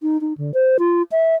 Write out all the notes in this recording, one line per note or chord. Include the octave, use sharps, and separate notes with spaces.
D#4
D#4
D3
C5
F4
E5